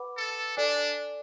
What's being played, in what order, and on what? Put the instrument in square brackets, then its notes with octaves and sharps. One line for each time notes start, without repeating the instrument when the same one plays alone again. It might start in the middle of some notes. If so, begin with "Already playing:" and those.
Already playing: [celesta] B4 F#5 B5 D6
[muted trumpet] A4
[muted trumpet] D4 [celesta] A4 D5 G#5 D6